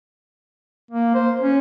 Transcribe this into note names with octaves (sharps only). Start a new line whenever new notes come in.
A#3
C5
C#4